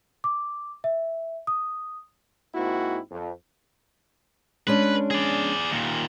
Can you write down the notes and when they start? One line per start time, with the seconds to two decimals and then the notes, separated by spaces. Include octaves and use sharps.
0.24 D6
0.84 E5
1.47 D#6
2.55 G#2 A#3 C4 E4 F#4
3.11 F2
4.67 G#3 C#4 D4 B4
5.11 G#4 D5
5.71 D#2 A#2